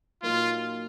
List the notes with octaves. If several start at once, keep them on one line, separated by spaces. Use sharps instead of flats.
A#2 F#3 A#3 D#4 F4